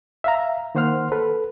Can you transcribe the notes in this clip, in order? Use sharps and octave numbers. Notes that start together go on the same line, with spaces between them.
E5 F5 A#5
D#3 A#3 C5 F#5 C6 F6
A4 B4